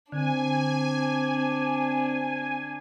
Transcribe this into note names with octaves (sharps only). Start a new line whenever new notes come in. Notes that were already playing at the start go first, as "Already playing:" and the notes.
D3 C4 D4 G#5